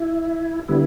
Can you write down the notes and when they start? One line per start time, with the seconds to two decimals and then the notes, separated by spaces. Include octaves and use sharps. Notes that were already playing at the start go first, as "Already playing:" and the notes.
Already playing: E4
0.68 D3 G3 B3 E4